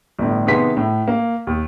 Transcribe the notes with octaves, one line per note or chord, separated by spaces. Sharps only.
G1 A2
C3 D#3 B3 G#4 C6 B6
A2
A#3
D#2